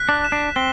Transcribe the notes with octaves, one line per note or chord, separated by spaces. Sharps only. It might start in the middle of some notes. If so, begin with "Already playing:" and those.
Already playing: F#6 B6
D4
E7
D4
C4 G7